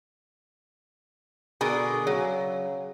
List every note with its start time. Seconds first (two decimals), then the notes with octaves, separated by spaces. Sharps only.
1.61 B2 D3 G#4 A#4
2.07 C#3 F#3